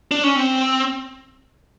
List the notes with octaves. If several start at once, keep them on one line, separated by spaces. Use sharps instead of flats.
D4
C#4
C4